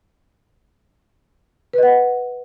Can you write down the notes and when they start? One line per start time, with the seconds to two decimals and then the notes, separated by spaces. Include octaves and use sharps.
1.73 B4
1.78 D#5
1.83 F#5